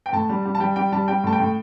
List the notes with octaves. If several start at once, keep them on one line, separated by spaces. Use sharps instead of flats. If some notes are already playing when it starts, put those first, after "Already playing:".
G5
A2 A5
G3
G3
A5
G3 G5
G3 G5
G3 A5
G3 G5
A2 A5
G5
A2